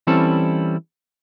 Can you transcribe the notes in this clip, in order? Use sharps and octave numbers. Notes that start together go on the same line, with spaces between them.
E3 G3 C4 C#4 E4 A4